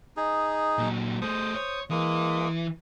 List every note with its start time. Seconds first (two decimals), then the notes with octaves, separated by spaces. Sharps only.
0.17 D#4 G#4
0.78 A#2 F#3
1.22 A3 G#4 C5 D#6
1.55 C#5
1.91 E3 G#3 A#3 D#6